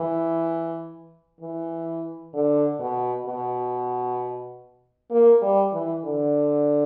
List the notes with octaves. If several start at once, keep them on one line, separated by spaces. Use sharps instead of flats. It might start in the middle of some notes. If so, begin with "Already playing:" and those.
Already playing: E3
E3
D3
B2
B2
A#3
G3
E3
D3